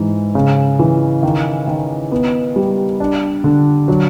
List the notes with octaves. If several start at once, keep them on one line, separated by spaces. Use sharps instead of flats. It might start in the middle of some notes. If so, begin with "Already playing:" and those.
Already playing: G#2 E3
C#3
E3
D#3
D#3
B3
G3
D4
D3
F#3